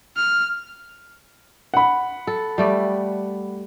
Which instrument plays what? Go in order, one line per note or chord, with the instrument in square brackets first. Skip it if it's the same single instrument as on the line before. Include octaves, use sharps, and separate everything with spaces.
[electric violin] F6
[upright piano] F#5 B5
[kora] A4
G3 A3 D5